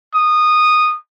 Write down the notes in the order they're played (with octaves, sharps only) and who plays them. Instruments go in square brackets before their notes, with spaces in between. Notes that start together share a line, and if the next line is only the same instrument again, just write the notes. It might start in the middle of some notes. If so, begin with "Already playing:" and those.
[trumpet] D#6